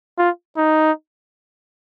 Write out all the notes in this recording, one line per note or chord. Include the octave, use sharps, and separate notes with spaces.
F4
D#4